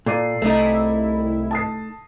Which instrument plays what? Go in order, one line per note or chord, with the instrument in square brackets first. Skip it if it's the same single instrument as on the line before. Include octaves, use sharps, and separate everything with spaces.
[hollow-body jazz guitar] A#2 [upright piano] A4 D5 D#7 [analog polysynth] C7
[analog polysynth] C2 E4 [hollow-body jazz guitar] A3 D#4
[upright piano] A5 D#6 C7